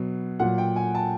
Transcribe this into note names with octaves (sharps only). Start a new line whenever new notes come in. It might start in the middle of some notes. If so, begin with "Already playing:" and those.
Already playing: B2 F#3
A#2 F#3 F#5
G5
G#5
A5